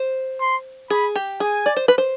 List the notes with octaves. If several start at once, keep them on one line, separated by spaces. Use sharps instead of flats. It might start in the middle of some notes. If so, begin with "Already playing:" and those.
Already playing: C5
C6
G#4 B5
G4
G#4 G#5
D5
C5
B4
C5